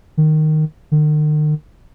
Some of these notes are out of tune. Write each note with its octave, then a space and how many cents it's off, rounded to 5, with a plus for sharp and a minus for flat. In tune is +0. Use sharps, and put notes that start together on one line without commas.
D#3 -10
D#3 -45